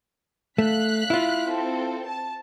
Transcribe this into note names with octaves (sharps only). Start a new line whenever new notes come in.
A3 F5 F#6 B6
E4 F4
C4 A4
A5